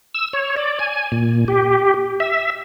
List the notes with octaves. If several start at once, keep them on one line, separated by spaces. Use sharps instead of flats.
E6
C#5
D5
G#5
A#2
G4
E5